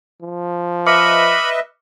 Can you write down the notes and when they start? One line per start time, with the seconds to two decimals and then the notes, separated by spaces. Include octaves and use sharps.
0.21 F3
0.87 B4 D#5 E5 B5 D6 F6 C#7